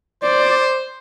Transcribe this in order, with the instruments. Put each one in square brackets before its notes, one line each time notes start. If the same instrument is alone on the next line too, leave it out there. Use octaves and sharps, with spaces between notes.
[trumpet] C5 [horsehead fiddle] D5